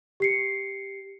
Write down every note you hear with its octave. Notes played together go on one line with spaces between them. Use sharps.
G4 C7 C#7